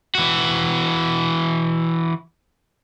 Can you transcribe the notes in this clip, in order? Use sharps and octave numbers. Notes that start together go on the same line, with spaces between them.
E3 F#4